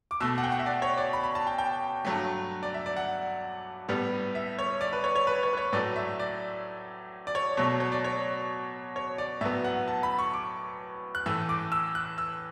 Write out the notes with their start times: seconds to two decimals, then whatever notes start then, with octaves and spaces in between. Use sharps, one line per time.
0.11 D6
0.20 B2 A3 E6
0.38 F#5
0.44 G5
0.52 F#5
0.59 E5
0.66 D5
0.82 C#5
0.98 D5
1.13 B5
1.24 B5
1.35 A5
1.47 G5
1.58 G5
2.05 G2 F#3 A3
2.63 D5
2.74 E5
2.86 D5
2.97 F#5
3.89 A2 G3 B3
4.35 E5
4.59 C#5
4.81 D5
4.93 B4
5.04 C#5
5.16 C#5
5.27 B4
5.43 C#5
5.53 B4
5.57 C#5
5.73 A2 F#3 A3 D5
5.96 E5
6.19 D5
7.27 D5
7.35 C#5
7.57 B2 F#3 A3 C#5
7.80 C#5
7.92 D5
8.04 C#5
8.96 C#5
9.18 D5
9.41 A2 E5
9.44 F#3 B3
9.64 F#5
9.88 A5
10.03 B5
10.19 C#6
10.34 D6
11.15 F#6
11.26 A2 E3 A3 E6
11.49 D6
11.72 E6
11.95 F#6
12.18 E6